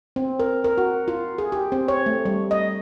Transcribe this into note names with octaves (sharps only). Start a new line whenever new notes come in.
C4
A#4
A#4
F#4
F4
G#4
G4
C4
C#5
A3
G3
D#5